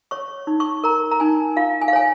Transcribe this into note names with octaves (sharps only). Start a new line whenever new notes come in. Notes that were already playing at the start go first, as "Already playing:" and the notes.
C#5 C#6
D#4
C#6
A#4 A#5
A#5
D#4 G#5
F4 F5
G#5
F5
C#5 G#5